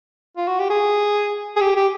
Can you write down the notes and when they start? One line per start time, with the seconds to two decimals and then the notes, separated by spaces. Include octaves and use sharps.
0.37 F4
0.48 F#4
0.59 G4
0.70 G#4
1.56 G#4
1.61 G4
1.76 G4